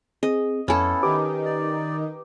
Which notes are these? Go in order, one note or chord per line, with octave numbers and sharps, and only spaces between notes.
C4 G#4 D#5
F2 B3 C#4 E4 A4
D#3 D#4 G4 B4 D6
D5